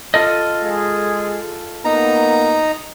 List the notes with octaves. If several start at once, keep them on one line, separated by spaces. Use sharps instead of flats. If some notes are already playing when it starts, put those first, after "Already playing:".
F4 A4 D#5
G#3 G#4
A#3 B3 D#4 A#5